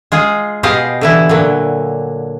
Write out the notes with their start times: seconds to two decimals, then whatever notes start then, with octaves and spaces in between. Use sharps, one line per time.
0.12 G#3 F4 G#4
0.63 B2 F4 G4 G#4 D#5 F5
1.01 D3 E3 E4
1.29 A#2 D3 F#3